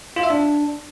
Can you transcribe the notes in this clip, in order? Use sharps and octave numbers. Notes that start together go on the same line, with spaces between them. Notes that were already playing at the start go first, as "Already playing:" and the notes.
F4
E5
D4